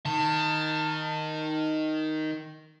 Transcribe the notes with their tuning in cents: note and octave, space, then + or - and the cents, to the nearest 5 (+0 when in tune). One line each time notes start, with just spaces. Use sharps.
D#3 +0 A5 +25